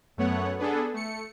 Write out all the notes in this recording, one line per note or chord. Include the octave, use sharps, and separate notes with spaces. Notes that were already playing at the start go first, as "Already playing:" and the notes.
F#2 A3 B3 C#5 F#5
B3 D4 G#4 A4
A3 C#7